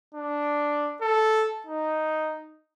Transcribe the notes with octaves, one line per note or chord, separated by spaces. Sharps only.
D4
A4
D#4